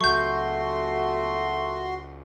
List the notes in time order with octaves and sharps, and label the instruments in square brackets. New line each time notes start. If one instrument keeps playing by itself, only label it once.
[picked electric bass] C#2 F#3 [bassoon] A3 [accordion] F#4 C6 [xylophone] C#6 G6